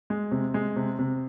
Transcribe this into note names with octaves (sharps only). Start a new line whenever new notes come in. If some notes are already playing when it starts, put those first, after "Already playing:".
G#3
C3
G#3
C3
C3